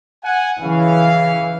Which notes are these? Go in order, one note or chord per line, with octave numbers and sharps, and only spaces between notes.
F#5 G#5
C#3 E3 C#4 F5